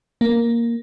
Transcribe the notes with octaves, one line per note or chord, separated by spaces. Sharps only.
A#3